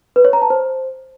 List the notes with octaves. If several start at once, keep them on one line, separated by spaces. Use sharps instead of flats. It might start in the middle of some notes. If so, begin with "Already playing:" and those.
B4
C#5
A#5
A5
C5